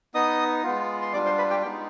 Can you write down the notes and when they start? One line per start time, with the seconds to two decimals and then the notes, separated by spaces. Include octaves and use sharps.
0.14 B3 D#4 D#5 D#6
0.64 G#3 B3 F4
1.02 C6
1.13 G3 D4 F4 D5 D6
1.25 C5 C6
1.38 B4 B5
1.50 G4 G5
1.62 G#3 B3 D#4 G4 G5